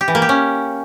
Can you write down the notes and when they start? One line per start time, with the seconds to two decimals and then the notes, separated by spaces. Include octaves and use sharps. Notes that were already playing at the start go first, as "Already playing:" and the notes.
0.01 G4
0.08 E3
0.15 A#3
0.22 G4
0.29 C#4